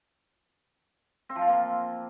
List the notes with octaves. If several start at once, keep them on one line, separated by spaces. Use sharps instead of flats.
C4
F3
F4
A#3